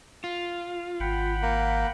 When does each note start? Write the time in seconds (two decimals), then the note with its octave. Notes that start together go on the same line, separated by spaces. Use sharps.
0.24 F4
1.00 G#1 F#5 G5 B5
1.42 A#3